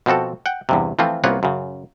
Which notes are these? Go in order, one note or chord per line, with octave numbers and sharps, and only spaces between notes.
B2 F3 C4 F#4 A4
F#5 G5
E2 G2 C3
E3 F3 A3 C4 F4
C2 A#3 B3 F4 C#5 F#5
F#2 C#3